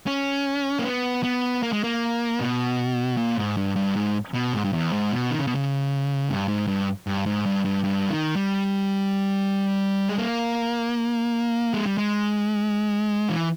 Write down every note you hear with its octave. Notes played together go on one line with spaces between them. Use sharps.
C#4
A#3
B3
B3
A#3
G#3
A#3
B2
A#2
G#2
G2
G2
G#2
B2
G#2
G2
E2
G#2
B2
D#3
C#3
B2
C#3
G2
G#2
G2
G2
G#2
G2
G2
G2
D#3
G3
G#3
A#3
G#3
G3
G#3
E3